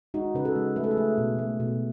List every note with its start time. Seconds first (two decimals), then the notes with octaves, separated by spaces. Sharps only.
0.14 G#3 D#4 F#4
0.35 C#3 B4
0.45 F#4 A4
0.56 G#3
0.76 A3 B4
0.84 A4
0.91 G#4 B4
0.97 A3
1.18 B2
1.39 A3
1.60 B2